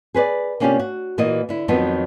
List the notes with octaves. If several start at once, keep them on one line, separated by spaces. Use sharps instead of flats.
G#4 B4 C5 D5
C3 A#3 C#4 D4 F4 G4
F#4
A#2 E3 A#3 F4 F#4 D#5
D3 E4
F2 D#3 F3 F#3 B3